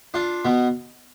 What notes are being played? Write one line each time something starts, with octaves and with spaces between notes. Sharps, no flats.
D4 F4
B2 B3